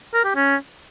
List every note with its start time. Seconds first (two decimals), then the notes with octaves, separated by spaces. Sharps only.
0.14 A#4
0.24 G4
0.35 C#4